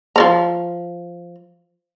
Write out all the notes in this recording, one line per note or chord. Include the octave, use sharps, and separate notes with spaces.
F3 D5 A#5